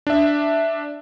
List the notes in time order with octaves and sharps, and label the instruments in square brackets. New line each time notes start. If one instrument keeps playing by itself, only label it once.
[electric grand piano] D4 E5